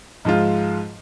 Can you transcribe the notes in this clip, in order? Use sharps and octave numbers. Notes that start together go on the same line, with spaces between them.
G#2 F3 G#3 F4